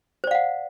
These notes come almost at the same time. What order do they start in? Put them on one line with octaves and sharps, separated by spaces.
C5 D5 F5 F#5